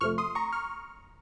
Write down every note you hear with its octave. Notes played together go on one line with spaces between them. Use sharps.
F2 C3 F3 A3 C#6 F6
C6 D#6
A#5 C#6
C#6 F6